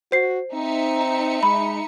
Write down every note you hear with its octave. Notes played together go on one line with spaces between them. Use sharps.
F#4 C5 C7
C4 D#4 E5 C#7
G#3 B5